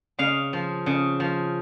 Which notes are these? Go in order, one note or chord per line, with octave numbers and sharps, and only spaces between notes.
C#3 F5
F3
C#3
F3